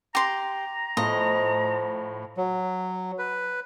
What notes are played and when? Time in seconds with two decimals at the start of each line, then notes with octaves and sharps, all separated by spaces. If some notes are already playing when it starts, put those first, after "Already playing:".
0.15 G4 A#5 C6
0.97 A2 F3 D#5 F5 C6
2.37 F#3
3.19 B4